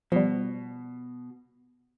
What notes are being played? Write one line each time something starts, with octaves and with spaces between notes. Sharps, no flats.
B2 F3 G3